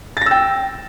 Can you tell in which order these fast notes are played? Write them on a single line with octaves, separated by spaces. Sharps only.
A6 A#6 E6 G5